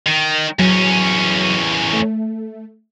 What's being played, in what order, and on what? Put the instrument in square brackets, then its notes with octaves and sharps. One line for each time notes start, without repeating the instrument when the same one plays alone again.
[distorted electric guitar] D#3
[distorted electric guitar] E2 C#4 [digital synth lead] F#3
[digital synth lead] A3